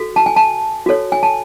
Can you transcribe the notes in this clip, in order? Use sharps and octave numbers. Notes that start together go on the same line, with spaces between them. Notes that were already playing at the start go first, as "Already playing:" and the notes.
Already playing: F#4 A4
A5
G#5
A5
F#4 A4 C#5
G#5
A5